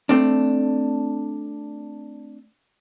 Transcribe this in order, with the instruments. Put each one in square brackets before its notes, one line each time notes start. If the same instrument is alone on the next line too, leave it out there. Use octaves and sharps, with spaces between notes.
[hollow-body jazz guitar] A3 C4 D4